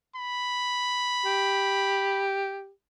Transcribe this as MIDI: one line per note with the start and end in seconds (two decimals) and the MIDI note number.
0.16 2.24 83
1.25 2.70 67